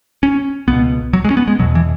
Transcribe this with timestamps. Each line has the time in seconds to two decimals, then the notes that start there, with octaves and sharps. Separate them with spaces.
0.23 C#4
0.68 C#2 B2 B3
1.13 F#3
1.25 G#3
1.30 C#4
1.37 B3
1.48 G#3
1.59 B2 F#3
1.63 E2
1.75 E3